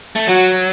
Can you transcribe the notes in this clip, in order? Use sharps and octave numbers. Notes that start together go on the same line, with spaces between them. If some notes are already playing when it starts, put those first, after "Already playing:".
A3
F#3 F#4